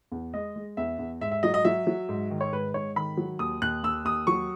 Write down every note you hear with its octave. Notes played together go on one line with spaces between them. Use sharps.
E2
G#3 D#5
G#3
E2 E5
E2
G#2 E5
E5
F#3 D#5
D#5
F#3 E5
F#3
G#2
D#3
C#5
G#2 B4
G#2 C#5
D#3 B5
F#3
D#2 D#6
D#2 F#6
D#2 E6
D#2 D#6
F#3 C#6